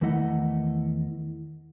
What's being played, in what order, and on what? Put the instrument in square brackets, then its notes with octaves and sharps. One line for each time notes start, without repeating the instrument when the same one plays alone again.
[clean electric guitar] E2 D#3 A3 E4 D#5 F#5